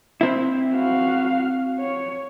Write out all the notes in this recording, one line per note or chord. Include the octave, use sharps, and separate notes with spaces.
C4 E4
F#4 F5
C#5